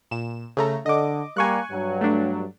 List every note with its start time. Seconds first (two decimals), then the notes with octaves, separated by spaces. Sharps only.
0.11 A#2 E7
0.57 C#3 A3 A#5
0.86 D3 D#5 D6
1.37 G3 A#3 G#5 C#6 F#6
1.71 G2 F#3
2.01 A3 D4